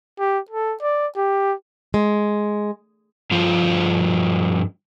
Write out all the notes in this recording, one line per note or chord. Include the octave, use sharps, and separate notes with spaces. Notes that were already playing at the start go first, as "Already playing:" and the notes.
G4
A4
D5
G4
G#3
G2 F3 F4 C5 F5